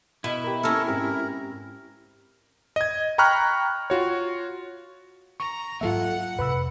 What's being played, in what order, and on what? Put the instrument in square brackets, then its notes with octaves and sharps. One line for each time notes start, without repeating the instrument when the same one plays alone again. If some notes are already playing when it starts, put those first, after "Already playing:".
[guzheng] B2 [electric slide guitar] E4
[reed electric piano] G4 A#4
[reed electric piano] A#3 [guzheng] C#4 C#5 [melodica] A4 A#4
[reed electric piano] G#2 C4 G4 [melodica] A#4
[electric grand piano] D#5 G#6
G5 A#5 B5 C#6 F6 F#6
F4 F#4 C#5
[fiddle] A#5 [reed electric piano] C#6
[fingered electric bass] G#2 F#3 A#3 [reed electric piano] F4 A4 E5 [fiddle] F#5
[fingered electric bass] F2 C3 [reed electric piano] B4 B5 E6